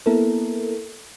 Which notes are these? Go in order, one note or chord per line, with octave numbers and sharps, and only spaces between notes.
A#3 B3 E4 A4 A#4